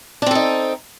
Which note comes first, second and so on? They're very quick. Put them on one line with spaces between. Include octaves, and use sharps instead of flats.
D4 C4 A4 D#4